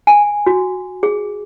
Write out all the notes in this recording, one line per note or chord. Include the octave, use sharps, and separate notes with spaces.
G#5
F#4
G#4